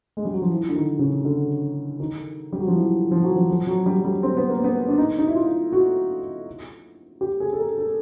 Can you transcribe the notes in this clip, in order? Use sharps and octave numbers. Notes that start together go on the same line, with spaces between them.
G#3
G3
F#3
F3
E3
D3
D#3
C#3
D3
D#3
G3
F#3
F3
E3
F3
F#3
F3
F3
F#3
G3
G3
C4
B3
A#3
B3
D4
D#4
D#4
E4
F4
F#4
G4
G#4
A4
A#4
A4